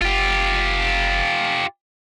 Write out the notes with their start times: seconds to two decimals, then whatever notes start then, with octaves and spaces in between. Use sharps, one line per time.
0.01 F#1 F4 G4